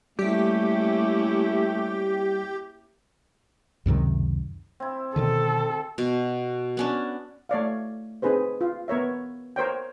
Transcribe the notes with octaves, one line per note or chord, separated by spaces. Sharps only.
G3 A3 A#3 C#4 E4 G4 D5
C#2 F#2 C3 D#3
C4 E4
B2 D3 D#3 A4
B2
B3 C#4 D4
A3 C#5 D5 F5
C4 D#4 G#4 B4 C5
F4
B3 A#4 C#5 E5
A#4 C5 C#5 G5